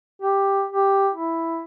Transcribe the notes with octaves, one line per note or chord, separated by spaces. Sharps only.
G4
G4
E4